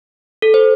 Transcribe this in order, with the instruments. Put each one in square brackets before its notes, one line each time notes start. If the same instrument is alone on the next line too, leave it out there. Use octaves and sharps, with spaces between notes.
[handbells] A4
C5